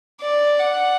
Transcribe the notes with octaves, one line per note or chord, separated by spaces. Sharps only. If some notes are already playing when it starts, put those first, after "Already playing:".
D5
F#5